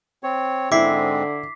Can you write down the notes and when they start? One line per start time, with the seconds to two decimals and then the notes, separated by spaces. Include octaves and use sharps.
0.23 C4 C#5
0.72 G#2 D3 G#3 C4 E4 D6 B6 C7